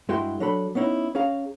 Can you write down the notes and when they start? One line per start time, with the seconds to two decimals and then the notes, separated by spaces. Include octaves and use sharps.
0.09 G2 G#3 E4 F#4 G5 C6
0.40 F#3 D4 A4 B5
0.75 B3 C#4 D#4 E4
1.15 C#4 G#4 F5 A#5